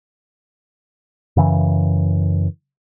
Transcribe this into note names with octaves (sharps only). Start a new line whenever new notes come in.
F#2 C#3 E3